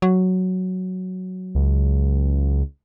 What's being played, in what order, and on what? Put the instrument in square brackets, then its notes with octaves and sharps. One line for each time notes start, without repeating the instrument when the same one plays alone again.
[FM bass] F#3
[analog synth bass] C#2